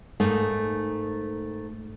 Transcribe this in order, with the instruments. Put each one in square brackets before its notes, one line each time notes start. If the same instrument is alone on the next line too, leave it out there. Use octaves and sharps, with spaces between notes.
[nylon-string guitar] G#2 A3 A#3 D#4